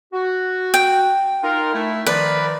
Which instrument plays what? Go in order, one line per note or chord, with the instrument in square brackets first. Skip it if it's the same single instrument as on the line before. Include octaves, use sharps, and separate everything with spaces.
[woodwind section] F#4
[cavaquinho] G5
[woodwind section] D#4 F4 A#4
A3 E4
[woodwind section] D#3 F3 D5 [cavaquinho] B4